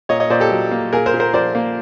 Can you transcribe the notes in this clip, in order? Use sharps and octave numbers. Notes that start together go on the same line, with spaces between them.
A#2 C#5 D#5
C#5 D#5
A#2 C5 D5
G4 A4
F#3
A#3
A#2 G#4 A#4
A#4 C5
A#2
A#4 C5
F3 C5 D5
A#3